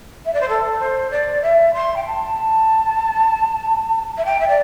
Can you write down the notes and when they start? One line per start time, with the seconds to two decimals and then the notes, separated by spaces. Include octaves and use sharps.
0.25 E5
0.33 D5
0.41 C5
0.48 A4
0.79 C5
1.10 D5
1.42 E5
1.74 C6
1.96 G5
2.05 A5
4.17 E5
4.25 G5
4.40 E5
4.48 D5